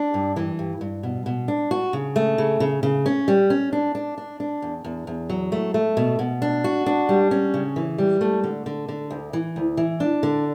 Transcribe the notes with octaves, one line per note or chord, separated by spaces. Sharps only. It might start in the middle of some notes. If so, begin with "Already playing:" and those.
Already playing: D4
G2
E3
G2
G2
B2
B2
D4
F#4
C#3
A3
C#3
C#3
C#3
C#4
G3
C#4
D4
D4
D4
D4
E2
E2
E2
F#3
A3
A3
B2
B2
D4
F#4
D4
G3
C#4
C#3
E3
G3
A3
D3
D3
D3
D2
E3
D2
E3
D4
D3